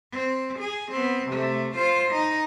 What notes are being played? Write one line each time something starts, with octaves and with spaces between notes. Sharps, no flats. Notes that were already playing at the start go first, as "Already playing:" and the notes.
C4
G#4
B3 C4
C3 A3
F4 C5
D#4